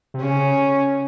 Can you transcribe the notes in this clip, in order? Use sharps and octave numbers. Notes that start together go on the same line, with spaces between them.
C3
C#3 C#4